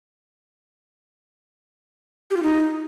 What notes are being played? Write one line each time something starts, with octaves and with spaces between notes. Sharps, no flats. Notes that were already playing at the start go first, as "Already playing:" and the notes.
G4
F4
D#4